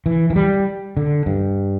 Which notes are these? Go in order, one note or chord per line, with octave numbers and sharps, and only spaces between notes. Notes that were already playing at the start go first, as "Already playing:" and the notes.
E3
E3
G3
D3
G2